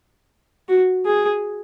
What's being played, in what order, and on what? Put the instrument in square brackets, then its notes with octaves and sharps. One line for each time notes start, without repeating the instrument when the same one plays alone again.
[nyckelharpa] F#4
G#4